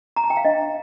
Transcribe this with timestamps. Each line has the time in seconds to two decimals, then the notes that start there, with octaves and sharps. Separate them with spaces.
0.16 A#5
0.24 A5
0.30 G5
0.37 F5
0.45 D4 D#5
0.60 D4